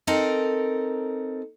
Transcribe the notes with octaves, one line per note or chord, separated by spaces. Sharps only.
C4 D#4 A4 A#4